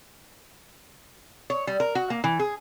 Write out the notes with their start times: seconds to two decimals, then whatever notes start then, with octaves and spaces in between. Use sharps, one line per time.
1.50 C#5
1.67 G3
1.80 A#4
1.95 F#4
2.10 A#3
2.24 E3
2.39 G#4